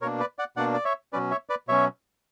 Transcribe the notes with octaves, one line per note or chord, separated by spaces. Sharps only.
B2 A#3 D4 A#4 C#5
B4 D5
D5 F#5
B2 A#3 D4 D5 F#5
D5
C#5 E5
B2 F#3 C#4 B4 D5
C#5 E5
B4 D5
B2 F#3 C#4 C#5 E5